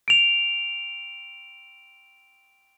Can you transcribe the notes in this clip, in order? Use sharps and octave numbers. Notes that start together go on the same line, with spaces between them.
D7 F7